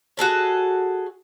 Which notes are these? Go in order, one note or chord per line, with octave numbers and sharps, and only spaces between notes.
F#4 G#4 A4 C#5